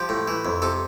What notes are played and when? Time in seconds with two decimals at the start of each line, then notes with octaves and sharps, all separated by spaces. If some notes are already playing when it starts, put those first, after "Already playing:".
Already playing: F3 G4
0.09 A2
0.28 E3
0.45 F2
0.62 C3 A4